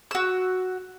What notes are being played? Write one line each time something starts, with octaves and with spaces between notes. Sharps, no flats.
F#4 E6